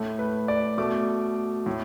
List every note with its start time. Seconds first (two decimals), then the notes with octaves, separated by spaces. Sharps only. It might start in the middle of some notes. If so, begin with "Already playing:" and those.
Already playing: A2 A3
0.19 B4
0.48 D5
0.78 B2 A3 D6
1.66 A2